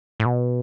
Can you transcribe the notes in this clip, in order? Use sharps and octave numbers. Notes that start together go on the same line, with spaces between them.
A2
B2